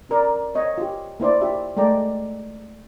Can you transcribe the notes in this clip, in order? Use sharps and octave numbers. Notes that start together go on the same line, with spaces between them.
C#4 A4 A#4 D5
C4 C#5 D#5
F4 G4
A#3 E4 C5 D5
F4 G4 E5
G#3 A3 D5 G5 A#5